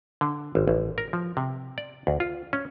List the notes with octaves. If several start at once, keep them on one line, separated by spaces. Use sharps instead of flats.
D3
G#1
A1
A#4
F3
C3
D5
D2
F4
C#4